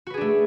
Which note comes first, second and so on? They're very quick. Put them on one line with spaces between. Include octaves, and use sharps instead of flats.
F#4 B4 G#4 D4 A3